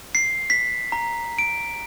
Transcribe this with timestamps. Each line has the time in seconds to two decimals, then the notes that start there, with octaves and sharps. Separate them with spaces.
0.15 C7
0.50 B6
0.92 A#5
1.39 D7